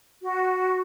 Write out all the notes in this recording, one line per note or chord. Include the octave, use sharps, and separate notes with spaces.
F#4